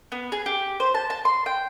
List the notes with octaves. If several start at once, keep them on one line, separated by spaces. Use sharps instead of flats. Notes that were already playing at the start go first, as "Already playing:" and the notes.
B3
G#4
G4
C5
A5
A5
C6
G5